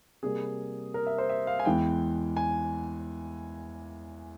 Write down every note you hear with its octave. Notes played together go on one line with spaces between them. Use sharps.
C3 G3 A#3 G#4
A#4
E5
C5
E5
F5
G#5
E2 E3 G#3 G5
G#5